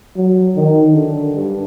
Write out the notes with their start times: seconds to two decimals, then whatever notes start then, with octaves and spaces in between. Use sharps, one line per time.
0.17 F#3
0.55 D#3
0.93 D3
1.36 G2